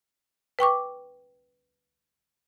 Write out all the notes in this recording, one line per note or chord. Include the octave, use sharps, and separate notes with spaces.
B4 G5 C#6 D6